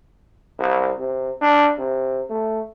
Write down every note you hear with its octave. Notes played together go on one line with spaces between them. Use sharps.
C2
C3
D4
C3
A3